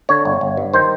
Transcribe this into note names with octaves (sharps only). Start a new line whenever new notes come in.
D3 C#5
G1
G1
G2
D#3 C5